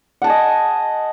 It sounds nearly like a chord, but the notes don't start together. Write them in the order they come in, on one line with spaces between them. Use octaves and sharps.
F#5 A5 G#5 D#5